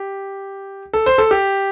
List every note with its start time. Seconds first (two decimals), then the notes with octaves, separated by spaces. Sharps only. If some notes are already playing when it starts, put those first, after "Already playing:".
Already playing: G4
0.93 A4
1.06 C5
1.18 A4
1.31 G4